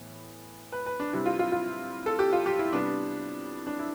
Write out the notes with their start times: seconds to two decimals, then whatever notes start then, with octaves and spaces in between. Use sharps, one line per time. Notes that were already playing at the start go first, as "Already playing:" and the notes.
Already playing: A2 E3 B3
0.72 B4
0.86 B4
1.00 D4
1.13 C3 G3 C4 E4
1.26 F4
1.39 F4
1.52 F4
2.06 A4
2.19 G4
2.33 F4
2.46 G4
2.59 E4
2.73 C3 G3 B3 D4
3.67 D4
3.79 E4